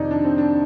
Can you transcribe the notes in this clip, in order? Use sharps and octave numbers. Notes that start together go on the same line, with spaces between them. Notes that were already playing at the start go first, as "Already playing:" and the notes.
Already playing: F2 C3 D#3 D#4 D5
D4
C4
D4